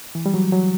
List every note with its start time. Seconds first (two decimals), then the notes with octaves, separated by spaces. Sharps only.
0.15 E3
0.26 G3
0.34 F#3
0.52 F#3